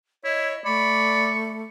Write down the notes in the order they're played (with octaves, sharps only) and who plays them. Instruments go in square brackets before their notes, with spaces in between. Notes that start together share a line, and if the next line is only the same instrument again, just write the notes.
[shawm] E4 [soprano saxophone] C#5 [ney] D#5
[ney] A3 [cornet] D5 [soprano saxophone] B5 [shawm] C#6